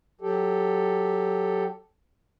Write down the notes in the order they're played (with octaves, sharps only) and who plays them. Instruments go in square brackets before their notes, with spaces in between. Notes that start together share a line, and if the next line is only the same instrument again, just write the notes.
[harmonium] F#3 G4 A4